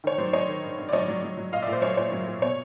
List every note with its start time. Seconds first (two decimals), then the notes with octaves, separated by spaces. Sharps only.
0.04 D#3 C#5
0.18 F#3 C5 D5
0.33 F#3 C#5 D#5
0.48 D#3
0.63 G2
0.78 G2
0.89 D5
0.92 F#3 C#5 D#5
1.08 F#3
1.23 F#3
1.38 F#3
1.52 A#2 D#5 F5
1.62 D5 E5
1.68 A#2 C5
1.82 F#3 C#5
1.97 A#2 C#5
2.12 F#3
2.27 A#2
2.42 B2 C#5